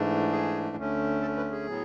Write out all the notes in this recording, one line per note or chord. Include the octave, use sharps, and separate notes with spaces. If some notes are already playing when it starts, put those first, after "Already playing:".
Already playing: G#2 E3 A3 D4
G#4
D2 D3 A3 C#4
A4
B4
G#4
A2 F#3 B3